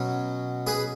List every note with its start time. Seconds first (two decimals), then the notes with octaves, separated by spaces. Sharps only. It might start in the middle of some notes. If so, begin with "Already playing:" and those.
Already playing: B2 F#3 C#4
0.67 G#4 B4